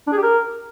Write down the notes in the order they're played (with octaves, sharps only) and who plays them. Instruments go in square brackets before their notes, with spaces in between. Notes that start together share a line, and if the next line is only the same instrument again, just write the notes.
[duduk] D4
G#4
G4
A#4